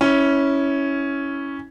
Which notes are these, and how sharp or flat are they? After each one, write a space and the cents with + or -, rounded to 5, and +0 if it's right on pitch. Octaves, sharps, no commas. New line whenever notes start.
C#4 +0 E4 -20